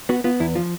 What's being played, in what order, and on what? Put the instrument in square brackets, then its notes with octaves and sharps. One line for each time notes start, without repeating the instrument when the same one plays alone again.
[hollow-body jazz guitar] B3 F#4
B3 F4
E2 E4
F3 F4